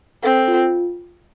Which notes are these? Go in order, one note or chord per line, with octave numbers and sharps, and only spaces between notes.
C4 A4
F4